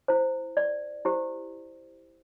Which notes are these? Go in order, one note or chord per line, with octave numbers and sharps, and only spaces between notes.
E4 C5
D5
E4 G4 C5